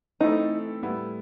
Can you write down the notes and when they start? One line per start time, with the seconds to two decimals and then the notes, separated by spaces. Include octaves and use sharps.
0.21 E3 A3 C4 D#4 E4 A4
0.82 A2 G3 B3 E4